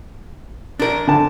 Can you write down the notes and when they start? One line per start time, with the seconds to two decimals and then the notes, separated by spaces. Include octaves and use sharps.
0.80 D4 A#4
1.07 D3 A5